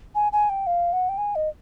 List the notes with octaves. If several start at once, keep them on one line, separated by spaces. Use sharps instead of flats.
G#5
G#5
G5
F5
F#5
G5
G#5
D#5